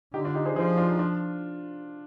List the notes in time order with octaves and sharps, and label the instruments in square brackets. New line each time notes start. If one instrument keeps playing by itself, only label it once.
[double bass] D3 [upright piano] D#4 G4
[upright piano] D4 F4
D#4 G4
G#4 C5
[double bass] F3 [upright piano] G#4 C5
[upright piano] D4 F4
D#4
D4 F4